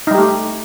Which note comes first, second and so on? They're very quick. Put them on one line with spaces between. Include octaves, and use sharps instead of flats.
D#4 G3 G4 A3